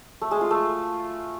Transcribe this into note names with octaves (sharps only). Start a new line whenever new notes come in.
A3
G#3
F4
A3